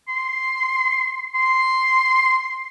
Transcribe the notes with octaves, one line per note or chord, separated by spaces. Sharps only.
C6
C6